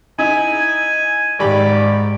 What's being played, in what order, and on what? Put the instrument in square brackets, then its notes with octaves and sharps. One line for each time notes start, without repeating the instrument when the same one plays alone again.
[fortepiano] D#4 E4 [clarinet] G#5
[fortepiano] G#1 G4 B5 [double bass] G#2 [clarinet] D5